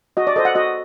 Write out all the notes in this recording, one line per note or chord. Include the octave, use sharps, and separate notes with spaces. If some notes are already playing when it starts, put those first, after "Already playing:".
F#4 D#5
D5
A4 C5 D#5
F#5
F#4 D#5